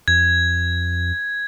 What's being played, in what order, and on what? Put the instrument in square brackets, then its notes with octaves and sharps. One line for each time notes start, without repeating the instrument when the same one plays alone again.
[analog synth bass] F2 [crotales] G#6